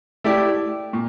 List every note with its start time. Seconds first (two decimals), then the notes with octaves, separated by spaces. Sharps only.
0.24 A3 E4 G4 D5
0.93 A#2